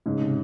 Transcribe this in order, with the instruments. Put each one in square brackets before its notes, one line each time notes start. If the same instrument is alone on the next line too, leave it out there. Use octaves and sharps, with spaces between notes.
[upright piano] G#2 [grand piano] C#3
[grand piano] C3